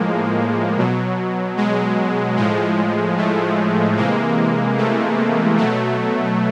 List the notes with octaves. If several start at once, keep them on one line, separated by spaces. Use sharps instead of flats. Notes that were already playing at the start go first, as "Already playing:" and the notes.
Already playing: A2 F3 G#3 A#3
B2 F#3
G#3
A2 F3 G#3
A3
C3 E3 G#3 A#3
A3
B2 F#3 A3